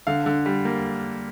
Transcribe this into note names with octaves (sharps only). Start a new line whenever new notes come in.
D3 F5
D3
G3
A#3